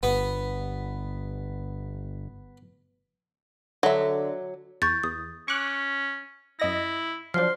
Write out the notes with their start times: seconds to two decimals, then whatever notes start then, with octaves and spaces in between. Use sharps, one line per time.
0.03 G1 B3
3.83 D3 F#3 E5
4.82 E2 C#6 G6 A6
5.04 E2 D#6
5.48 C#4 C#6 D6 F#6
6.60 F#2 E4 D#5 A#6
7.34 F3 F#3 D4 C5 C6 F6